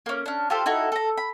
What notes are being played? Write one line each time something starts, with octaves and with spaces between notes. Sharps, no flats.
A#3 C#4
C#4 D4
F4 G4 A4 C5
D#4 E4 F#4 A4
A4 A#5
B5